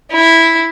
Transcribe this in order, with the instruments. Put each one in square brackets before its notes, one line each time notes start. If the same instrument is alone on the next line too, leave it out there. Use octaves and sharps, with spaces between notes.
[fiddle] E4